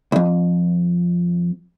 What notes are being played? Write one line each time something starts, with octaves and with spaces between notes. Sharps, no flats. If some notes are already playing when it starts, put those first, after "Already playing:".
C2 F2